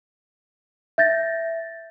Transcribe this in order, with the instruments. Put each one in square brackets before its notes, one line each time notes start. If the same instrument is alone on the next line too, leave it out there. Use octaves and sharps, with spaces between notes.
[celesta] E5 G6 A6 A#6